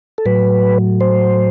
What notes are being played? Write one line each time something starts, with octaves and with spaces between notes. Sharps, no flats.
A4
A2 F#3 B4
C5